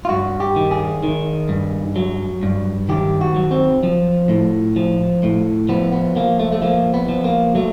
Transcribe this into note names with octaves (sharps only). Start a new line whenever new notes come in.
F4
G2 F#4
G4
D#3
G#4
D#3
G2
F#3
G2
D#3 G4
F#4
F#3
C4
F3
A2
F3
A2
F3 B3
B3
F3 A#3
A3
A3
F3 A#3
B3
F3
A#3
F#3 A3